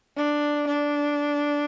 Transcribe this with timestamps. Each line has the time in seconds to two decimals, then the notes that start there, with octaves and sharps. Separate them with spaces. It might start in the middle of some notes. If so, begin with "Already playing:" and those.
0.17 D4
0.67 D4